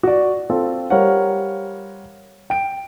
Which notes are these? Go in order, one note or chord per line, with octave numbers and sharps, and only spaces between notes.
F#4 D5
C4 F4 A4
G3 A#4 C5 C#5 F5 F#5
G5 D7